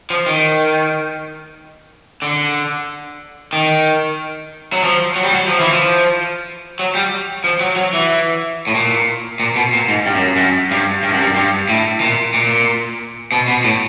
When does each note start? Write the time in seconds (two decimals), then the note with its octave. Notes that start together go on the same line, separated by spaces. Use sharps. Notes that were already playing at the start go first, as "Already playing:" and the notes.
0.10 F3
0.26 D#3
2.22 D3
3.53 D#3
4.73 F#3
4.84 F3
5.16 F#3
5.23 G3
5.31 F#3
5.48 F3
5.60 E3
5.71 F3
6.79 F#3
6.95 G3
7.44 F3
7.61 F#3
7.76 F#3
7.93 E3
8.67 A2
8.75 A#2
9.40 A#2
9.56 B2
9.73 A#2
9.88 G#2
10.06 G2
10.15 F#2
10.36 F#2
10.71 G2
11.03 G2
11.13 F#2
11.21 G2
11.36 G2
11.69 A2
12.01 A#2
12.34 A#2
13.32 B2
13.48 B2
13.64 A2